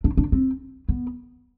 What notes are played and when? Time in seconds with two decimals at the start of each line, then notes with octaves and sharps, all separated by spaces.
0.04 D4
0.17 D4
0.32 C4
0.89 B3